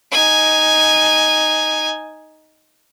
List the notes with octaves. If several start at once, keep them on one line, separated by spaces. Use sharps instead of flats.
D#4 G#5